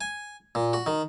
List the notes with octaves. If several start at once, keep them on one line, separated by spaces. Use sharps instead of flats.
G#5
A#2
F#4
D#3